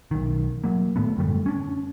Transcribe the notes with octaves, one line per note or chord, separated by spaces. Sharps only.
B1 D#3
F#3 A#3
A2 D#3 A3 B3
F#2 D3 G3 A3
C#4 D4